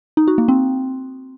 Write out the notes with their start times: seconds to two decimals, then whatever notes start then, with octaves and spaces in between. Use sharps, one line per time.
0.17 D#4
0.28 F#4
0.38 A#3
0.48 C4